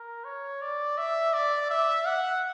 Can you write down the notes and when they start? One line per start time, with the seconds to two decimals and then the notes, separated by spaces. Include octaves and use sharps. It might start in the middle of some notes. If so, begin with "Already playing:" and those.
Already playing: A#4
0.25 C#5
0.62 D5
0.98 E5
1.34 D5
1.70 E5
2.06 F#5